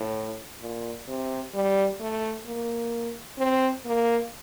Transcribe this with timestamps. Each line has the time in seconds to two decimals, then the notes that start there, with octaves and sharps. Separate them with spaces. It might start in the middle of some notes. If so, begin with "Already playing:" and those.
Already playing: A2
0.61 A#2
1.08 C3
1.54 G3
2.01 A3
2.46 A#3
3.38 C4
3.85 A#3